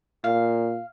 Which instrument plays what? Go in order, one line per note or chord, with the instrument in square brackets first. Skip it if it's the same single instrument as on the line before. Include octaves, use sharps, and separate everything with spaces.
[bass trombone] A#2 [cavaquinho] F5